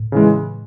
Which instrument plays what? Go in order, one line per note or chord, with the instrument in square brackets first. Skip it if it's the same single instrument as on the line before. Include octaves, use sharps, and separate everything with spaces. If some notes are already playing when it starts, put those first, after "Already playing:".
Already playing: [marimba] A2
[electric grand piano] C#3 E3 G#3